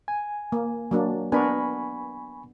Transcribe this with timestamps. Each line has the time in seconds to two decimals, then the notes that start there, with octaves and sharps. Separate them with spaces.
0.08 G#5
0.52 A#3
0.91 F#3 A#3 D4
1.32 B3 D4 A#4 G#5 B5 C#6